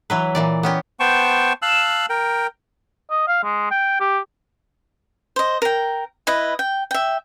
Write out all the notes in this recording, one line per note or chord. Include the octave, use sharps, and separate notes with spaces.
E3 F#3 B4
A#2 E3 D5
B3 C#4 G4
B3 C5 G5 A5 C#6
F5 A5 E6 F#6
A#4 G5
D#5
F5
G#3
G5
G4
C5 D#5
A#4 G5
E4 B4 D#5
G5
E5 G5